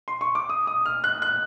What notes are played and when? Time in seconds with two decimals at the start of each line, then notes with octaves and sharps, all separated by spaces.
0.08 C6
0.21 C#6
0.35 D6
0.49 D#6
0.67 D#6
0.86 F6
1.04 F#6
1.22 F#6